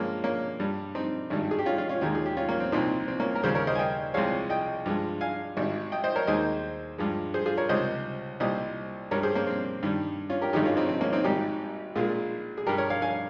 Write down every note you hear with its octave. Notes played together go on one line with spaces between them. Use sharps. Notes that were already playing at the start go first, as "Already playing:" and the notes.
Already playing: G2 F3 G#3 A#3 C#4
A#3 C#4
G2 G3
C4 D#4
G#1 G2 D#3 G3
G#4
G4
C#4 F4
C#4 F4
C#4 F4
D#2 D#3 G#3 C#4 F4
G#4
G4
C#4 F4
A#3 C#4
C4
C2 A#2 F3 C4 D#4
C4
A#3 C#4
A#4
D#2 C#3 G3 G#4 C5
A#4 C#5
C5 D#5
G#5
D#5 G5
C2 C3 F3 G#3 C#5 F5
D#5 G5
G2 F3 G#3
F5 G#5
G#1 G#2 G3
D#5 G5
C5 D#5
A#4 C#5
D#2 D#3 G#3 C5 D#5
G2 F3 G#3
G#4 C5
F4 G#4
A#4 C#5
C#2 C3 G3 C5 D#5
C2 A#2 G3 C5 D#5
G2 G3 A#4 C#5
G#4 C5
A#3 C#4
C4
G2 D#3 G3
C#4 F4
G4 A#4
G#1 G2 D#3 G#3 D#4 G4
C#4 F4
C4 D#4
C4
A#3 C#4
C4 D#4
G#1 G#2 G3 D#4 G4
A#1 A#2 G#3 F4 G#4
G#4
G2 G3 G4 A#4
A#4 C#5
C#5 F5
F5 G#5